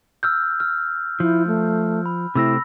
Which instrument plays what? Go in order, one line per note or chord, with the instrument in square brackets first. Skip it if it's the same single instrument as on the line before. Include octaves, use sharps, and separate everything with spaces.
[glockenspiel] E6 F6 G6
F6
[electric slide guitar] F3 [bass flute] E4
[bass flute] A3
[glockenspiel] B5
[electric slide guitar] C3 A3 C4 [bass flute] E4 [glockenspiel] B5 E6 A#6